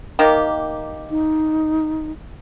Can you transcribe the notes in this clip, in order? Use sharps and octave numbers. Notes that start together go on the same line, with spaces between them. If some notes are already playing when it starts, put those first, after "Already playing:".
D#3 A#3 G4
D#4